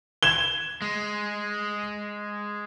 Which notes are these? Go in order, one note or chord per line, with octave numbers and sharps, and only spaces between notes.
G#6 E7 G7
G#3